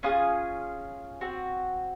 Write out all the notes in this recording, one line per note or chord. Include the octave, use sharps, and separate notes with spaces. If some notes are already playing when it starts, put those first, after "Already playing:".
C#4 F4 G#4 D#6
C4 F#4